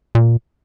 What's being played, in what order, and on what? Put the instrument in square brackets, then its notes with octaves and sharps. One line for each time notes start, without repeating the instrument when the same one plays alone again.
[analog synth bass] A#2